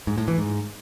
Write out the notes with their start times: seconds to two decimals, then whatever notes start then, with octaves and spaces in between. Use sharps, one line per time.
0.07 G#2
0.18 A2
0.28 E3
0.38 G#2